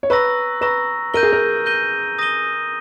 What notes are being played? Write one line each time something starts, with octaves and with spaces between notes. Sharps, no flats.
C#5
B4 A#5 C#6 E6 A#6
B4 A#5 C#6 E6 A#6
A#4 G6 A#6 D#7 G7
G#4
A#4
G6 A#6 D#7 G7
D#6 A#6 D#7 G7